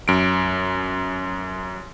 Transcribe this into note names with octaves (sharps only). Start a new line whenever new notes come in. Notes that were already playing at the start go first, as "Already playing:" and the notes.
F#2 D7